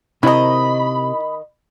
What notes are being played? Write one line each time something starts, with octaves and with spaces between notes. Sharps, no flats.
C3 D#3 E4 C5 D#5 A#5 B5